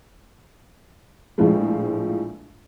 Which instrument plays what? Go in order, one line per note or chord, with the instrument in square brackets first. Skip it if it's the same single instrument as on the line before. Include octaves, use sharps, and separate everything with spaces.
[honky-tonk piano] A#1 A2 F3 G#3